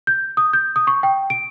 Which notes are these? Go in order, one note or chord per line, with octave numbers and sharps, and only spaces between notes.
G6
D#6
G6
D#6
C#6
G5
D7